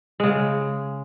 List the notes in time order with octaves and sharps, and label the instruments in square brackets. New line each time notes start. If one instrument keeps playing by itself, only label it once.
[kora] C#3 G#3